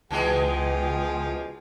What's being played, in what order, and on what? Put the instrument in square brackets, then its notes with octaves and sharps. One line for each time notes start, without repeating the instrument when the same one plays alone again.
[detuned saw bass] C#2 [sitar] B2 E3 G#3 [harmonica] F3 G#4 [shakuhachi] G5